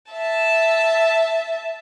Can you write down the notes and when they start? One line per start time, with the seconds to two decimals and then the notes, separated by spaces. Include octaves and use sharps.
0.12 E5 A5